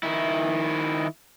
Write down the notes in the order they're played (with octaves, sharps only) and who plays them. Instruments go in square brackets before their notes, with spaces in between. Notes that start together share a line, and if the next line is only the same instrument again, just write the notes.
[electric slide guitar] D#3 E4